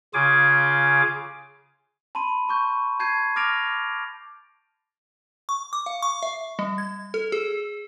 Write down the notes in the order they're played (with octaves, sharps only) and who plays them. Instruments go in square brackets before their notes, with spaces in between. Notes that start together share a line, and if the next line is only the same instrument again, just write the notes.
[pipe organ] C#3 F4 G#4 G#5 D6
[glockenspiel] A5 B5 C6 D#7
A5 C#6 G6
A5 G6 G#6 C7 D#7
D6 F6 A6 A#6 D7 F7
[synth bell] C#6
D6
F5
C#6
E5
G3
G#6
A4
G#4